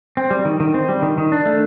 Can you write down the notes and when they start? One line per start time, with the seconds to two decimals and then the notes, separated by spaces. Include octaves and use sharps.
0.17 C4
0.31 G3
0.45 D#3
0.60 D#3
0.74 C4
0.89 G3
1.02 D#3
1.18 D#3
1.32 D4
1.46 A3